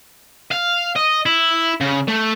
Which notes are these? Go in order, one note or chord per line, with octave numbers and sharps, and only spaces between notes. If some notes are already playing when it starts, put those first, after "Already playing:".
F5
D#5
E4
C#3
A3